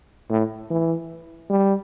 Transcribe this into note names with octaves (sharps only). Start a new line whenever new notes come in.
A2
E3
G3